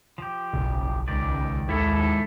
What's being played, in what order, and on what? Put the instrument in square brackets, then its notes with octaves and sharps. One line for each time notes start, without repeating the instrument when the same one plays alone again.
[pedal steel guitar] F3 G4
[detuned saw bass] F#1 [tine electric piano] B1
[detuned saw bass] C#2 [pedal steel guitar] D#3 G4 D5
[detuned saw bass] D#2 [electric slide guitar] G#2 E4 A4